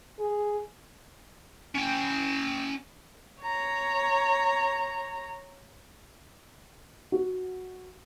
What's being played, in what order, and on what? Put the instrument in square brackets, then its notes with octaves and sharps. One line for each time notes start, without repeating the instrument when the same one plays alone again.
[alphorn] G#4
[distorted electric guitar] C#4 G5
[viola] C#5 A#5
[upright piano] F#4